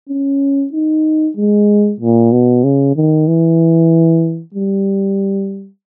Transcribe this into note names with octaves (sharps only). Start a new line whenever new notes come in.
C#4
D#4
G#3
A#2
B2
C#3
D#3
E3
G3